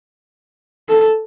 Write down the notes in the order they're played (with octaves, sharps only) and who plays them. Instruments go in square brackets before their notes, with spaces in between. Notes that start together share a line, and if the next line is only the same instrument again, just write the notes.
[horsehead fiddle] A4